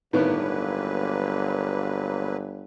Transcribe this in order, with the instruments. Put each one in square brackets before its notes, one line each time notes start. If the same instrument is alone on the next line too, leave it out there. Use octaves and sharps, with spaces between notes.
[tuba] G1 [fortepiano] A2 D#3 B3 [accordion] F#3 A#3 B4